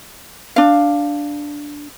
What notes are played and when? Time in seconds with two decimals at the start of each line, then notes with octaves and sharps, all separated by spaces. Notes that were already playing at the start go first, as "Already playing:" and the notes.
0.56 D4 F5